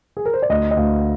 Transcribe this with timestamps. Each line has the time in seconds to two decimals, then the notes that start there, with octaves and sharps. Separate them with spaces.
0.17 G#4
0.25 A#4
0.33 C5
0.42 D5
0.49 D2 D#5
0.71 D#5
0.77 D2 F5